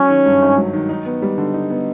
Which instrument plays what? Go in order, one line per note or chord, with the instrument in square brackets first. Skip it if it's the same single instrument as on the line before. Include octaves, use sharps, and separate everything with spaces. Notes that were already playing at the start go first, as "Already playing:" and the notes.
Already playing: [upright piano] F#3 [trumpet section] C#4
[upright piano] D#3
G2
G#1
F#3
D#3
D#4
B3
G3
D3
D#4
B3